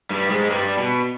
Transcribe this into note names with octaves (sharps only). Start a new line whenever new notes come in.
G2 G3
G#2 G#3
G2 G3
B2